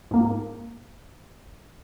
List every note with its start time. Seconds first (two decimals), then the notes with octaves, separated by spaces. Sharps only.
0.11 G#2 A#3